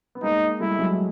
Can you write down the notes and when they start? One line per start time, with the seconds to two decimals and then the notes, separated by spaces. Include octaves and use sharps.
0.15 B3
0.23 G#3 A#3 D#4
0.60 G3 A3 E4
0.79 F#3 G#3